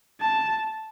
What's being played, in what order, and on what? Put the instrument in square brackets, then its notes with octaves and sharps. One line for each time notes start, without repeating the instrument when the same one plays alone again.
[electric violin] A5